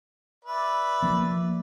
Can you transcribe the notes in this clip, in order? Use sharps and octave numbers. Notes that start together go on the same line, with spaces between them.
B4 D5 E5
F3 A#3